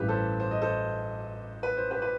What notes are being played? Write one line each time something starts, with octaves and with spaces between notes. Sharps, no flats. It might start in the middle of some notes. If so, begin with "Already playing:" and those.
Already playing: A1 G2 E3 G4 B4
A4 C5
C5
D#5
A4 C5
B4
C5
G4 B4
B4